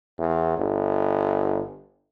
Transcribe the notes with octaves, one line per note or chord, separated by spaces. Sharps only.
E2
G1